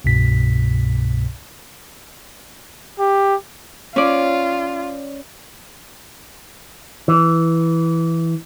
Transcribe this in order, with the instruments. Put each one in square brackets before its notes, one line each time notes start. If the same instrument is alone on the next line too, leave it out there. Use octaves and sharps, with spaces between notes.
[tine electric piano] C2 G2 B2 B6
[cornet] G4
[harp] C#4 D5 [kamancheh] F4
[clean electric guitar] E3